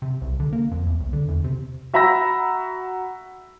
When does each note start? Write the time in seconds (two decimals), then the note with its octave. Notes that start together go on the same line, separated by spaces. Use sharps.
0.02 C3
0.21 C2
0.40 D3
0.53 A#3
0.71 F2
0.87 E2
1.00 C2
1.13 D3
1.28 E2
1.44 C3
1.94 F#4 E5 A#5 B5 E6 A#6